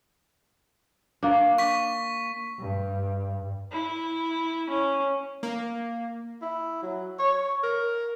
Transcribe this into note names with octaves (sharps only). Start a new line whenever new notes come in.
A#3 D4
C#6 B6
G2
E4
C#4
A#3
E4
F#3
C#5
A#4